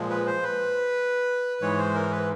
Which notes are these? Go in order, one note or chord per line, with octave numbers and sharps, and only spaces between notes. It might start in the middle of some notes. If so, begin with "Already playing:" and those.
Already playing: A#2 F3 G#3
B4
C5
B4
G#2 E3 G#3 C#5
C5
A#4
B4